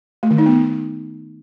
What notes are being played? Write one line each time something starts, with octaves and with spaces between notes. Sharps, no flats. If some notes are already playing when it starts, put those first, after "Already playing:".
A3
D#3
D#4
B3